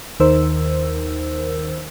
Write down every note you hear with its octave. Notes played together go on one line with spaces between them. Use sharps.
D#2 D#3 D#4 A#4 C5 E6